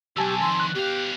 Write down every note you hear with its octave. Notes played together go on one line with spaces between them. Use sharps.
B1 E2 G4 G#5 A5 E6
F2 D#3 C6
F#6
B2 G4 F5